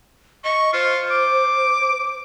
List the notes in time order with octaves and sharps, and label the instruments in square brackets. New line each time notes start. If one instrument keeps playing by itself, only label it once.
[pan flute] D#5 [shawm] C#6
[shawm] F4 [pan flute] C5
[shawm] D6